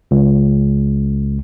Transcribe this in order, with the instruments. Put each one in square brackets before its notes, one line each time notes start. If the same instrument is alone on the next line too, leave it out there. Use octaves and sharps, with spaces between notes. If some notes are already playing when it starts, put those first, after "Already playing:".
[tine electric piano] C#2